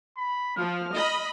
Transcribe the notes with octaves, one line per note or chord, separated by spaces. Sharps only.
B5
F3 F6
D#5 B5